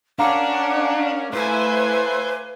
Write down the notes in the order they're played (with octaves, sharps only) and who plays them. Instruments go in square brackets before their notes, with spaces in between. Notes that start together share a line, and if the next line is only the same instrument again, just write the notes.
[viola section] C#4 A#4 [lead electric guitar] D4 [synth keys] F5 A#5 D6 [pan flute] F#5
[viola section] A3 E4 G#5 [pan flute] B4 [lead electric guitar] C5